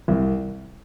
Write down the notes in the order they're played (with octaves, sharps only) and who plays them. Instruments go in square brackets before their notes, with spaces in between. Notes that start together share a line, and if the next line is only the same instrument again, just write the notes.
[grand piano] C2